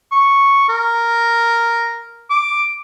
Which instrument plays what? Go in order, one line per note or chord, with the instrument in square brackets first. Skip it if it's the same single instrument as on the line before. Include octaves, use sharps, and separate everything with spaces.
[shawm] C#6
A#4
D6